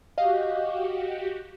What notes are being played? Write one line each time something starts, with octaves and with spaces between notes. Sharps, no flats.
F#4 G4 D#5 F5